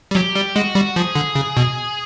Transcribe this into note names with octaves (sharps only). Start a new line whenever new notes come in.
G3
F#3 G4
G3
G#3 F#4
G3
F3 G#4
D3
C#3
B2